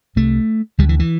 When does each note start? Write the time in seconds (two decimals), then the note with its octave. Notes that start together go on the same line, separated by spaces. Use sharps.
0.16 C2 C3 A3
0.78 D2 G3
0.82 D3
0.89 E3
0.99 E3